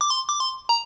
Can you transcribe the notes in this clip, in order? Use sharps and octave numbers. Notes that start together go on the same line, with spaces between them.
D6
C6
D6
C6
A#5